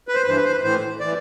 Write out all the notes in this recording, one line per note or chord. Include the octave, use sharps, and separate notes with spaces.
B4
C5
B4
G2 E3 C5
B4
C5
B4
A2 E3 C5
E3 D5